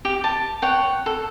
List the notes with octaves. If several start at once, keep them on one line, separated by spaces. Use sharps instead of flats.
G4
A5
C#5 F#5 G5
A4